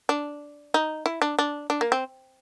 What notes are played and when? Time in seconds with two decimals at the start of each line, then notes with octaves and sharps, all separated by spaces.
0.09 D4
0.74 D#4
1.06 E4
1.22 D4
1.39 D4
1.70 D4
1.81 A#3
1.92 C4